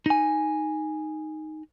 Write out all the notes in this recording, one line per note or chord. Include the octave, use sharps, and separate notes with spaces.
D#4 G#5